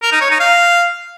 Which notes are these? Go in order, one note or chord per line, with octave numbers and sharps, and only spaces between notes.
A#4
D#4
C#5
D#4
F5